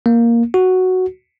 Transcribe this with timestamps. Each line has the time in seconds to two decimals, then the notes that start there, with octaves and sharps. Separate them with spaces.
0.06 A#3
0.54 F#4